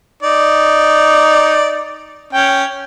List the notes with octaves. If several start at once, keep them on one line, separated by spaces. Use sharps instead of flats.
D#4 D5
C#4 G5